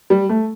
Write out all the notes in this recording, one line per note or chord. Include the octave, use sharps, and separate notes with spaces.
G3
A3